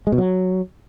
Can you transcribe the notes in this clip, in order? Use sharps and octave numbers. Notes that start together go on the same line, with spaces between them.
G#3
B2
F#3